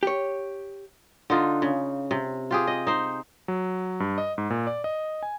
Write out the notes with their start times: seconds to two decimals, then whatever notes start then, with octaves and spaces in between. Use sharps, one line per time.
0.03 G4 C#5
1.30 D3 D4 D#4 F4
1.62 C#3
2.11 C3
2.51 F4 G4 G#4
2.67 D#5
2.87 D#4 C5
3.48 F#3
4.00 G2
4.18 D#5
4.38 G#2
4.50 A#2
4.67 D5
4.84 D#5
5.23 G#5